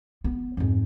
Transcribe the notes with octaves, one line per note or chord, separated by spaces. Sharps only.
B3
F2 G#2